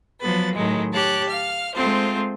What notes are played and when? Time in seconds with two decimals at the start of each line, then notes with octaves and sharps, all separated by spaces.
0.19 F3 F#3 B3 B4 A6
0.53 A2 D#3 F#3 G#3 A3
0.92 G4 C#5 A5 F#6
1.28 F5 F6
1.74 G#3 A3 C4 F4 C5